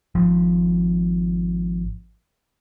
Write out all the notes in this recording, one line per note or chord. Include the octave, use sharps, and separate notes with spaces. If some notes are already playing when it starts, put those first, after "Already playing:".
G#1 F3